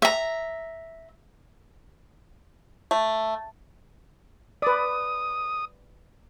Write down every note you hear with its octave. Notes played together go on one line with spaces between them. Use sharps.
E5 A#5
A3
B4 D5 D#6